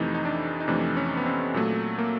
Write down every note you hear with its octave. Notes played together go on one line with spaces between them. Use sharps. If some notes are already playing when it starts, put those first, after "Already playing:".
Already playing: F2 C3 E3 A3 D#4
D#4
D4
D#4
F2 C3 E3 A3 D4
C#4
B3
C4
A#2 F#3 A3
A#3